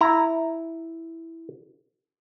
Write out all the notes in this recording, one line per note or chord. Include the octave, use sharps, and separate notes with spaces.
E4 A#5